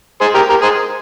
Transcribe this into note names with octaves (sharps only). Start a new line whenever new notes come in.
G#4 C5
G4 A#4
G4 A#4
G#4 C5